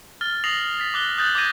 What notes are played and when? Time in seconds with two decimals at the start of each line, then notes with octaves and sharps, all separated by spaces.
0.21 F6 A6 G7
0.44 D#6 A#6 C7 F7 F#7
0.79 A6 B6
0.94 D6 F#6 G7
1.18 D#6 F#6 G6 A6 F#7
1.35 D6 G6 G#6 A#6 D#7